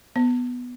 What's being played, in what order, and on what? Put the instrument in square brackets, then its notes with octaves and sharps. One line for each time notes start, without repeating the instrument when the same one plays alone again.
[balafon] B3